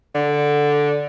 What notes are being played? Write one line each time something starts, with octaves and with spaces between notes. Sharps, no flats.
D3